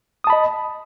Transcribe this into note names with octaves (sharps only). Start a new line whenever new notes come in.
D#5 A5 B5 D#6